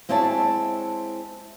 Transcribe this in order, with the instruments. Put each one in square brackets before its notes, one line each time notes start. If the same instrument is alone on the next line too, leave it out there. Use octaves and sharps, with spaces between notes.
[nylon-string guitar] G#3 C4 E4 C#5 A5